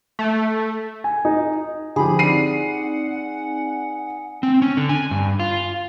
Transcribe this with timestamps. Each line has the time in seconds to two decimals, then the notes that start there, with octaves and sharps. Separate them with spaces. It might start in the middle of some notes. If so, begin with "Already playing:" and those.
0.19 A3
1.04 G#5
1.25 D#4
1.96 D3 F3 G4 G#4 B5
2.19 C4 D#4 D5 F#5 C7 D#7
4.43 C4
4.62 C#4
4.77 D3
4.89 G#5
5.11 G2
5.40 F4